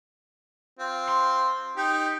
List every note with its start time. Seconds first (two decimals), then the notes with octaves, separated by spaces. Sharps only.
0.79 C4 F4
1.08 C6
1.77 D#4 G4